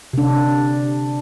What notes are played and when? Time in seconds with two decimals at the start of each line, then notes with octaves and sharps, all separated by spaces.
0.13 C3 D4